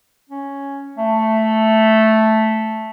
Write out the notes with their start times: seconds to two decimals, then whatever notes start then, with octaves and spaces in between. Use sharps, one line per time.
0.29 C#4
0.97 A3